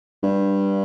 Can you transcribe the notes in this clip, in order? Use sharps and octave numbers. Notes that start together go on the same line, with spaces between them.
G2